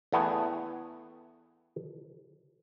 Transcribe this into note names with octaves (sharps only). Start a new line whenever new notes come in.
E2 A3 B3 G5 G#5